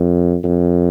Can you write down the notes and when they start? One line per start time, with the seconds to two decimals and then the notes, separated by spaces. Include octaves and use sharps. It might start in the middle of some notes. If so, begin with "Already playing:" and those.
Already playing: F2
0.44 F2